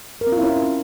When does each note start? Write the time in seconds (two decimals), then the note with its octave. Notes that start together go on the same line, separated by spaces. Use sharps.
0.21 A#4
0.27 C4
0.32 F4
0.38 E4
0.43 C#4